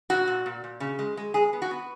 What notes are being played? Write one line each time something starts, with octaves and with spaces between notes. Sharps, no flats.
A#2 F#4
A#2
A#2
A#2
C#3
G#3
G#3
G#3 G#4
B3
F#4
B3